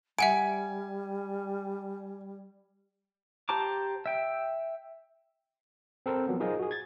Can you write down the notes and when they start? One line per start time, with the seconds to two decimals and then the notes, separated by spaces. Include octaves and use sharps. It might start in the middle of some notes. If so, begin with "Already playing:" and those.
0.19 G3 E5 F#5 G#5 D7
3.49 G4 C5 A5 A#5 D6
4.06 E5 G5
6.06 C4 A4 A#4 C5
6.28 F3 F#3 B3
6.40 D#4 F4 G#4 A#4 C5 D#5
6.59 F#4 G#4
6.71 G#6 A6